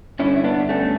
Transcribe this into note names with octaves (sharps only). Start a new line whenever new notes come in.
G2 D3 C#4 E4
E4
B3 D4
A3 C#4